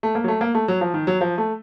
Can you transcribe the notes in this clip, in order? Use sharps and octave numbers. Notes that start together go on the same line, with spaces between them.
A3
A#3
F#3
A3
A#3
A3
F#3
F3
D#3
F#3
F3
A3